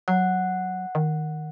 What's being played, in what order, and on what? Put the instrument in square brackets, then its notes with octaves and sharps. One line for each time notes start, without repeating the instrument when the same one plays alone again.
[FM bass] F#3 [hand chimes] F#5
[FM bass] D#3